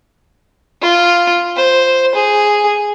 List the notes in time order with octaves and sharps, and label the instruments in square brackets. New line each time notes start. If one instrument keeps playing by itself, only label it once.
[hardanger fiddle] F4
C5
G#4